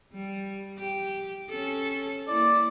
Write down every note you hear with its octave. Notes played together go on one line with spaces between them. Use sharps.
G3
G4
C#4 A4
A#3 E4 D5